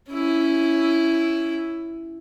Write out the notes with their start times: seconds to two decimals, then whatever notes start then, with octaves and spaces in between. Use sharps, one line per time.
0.10 C#4 E4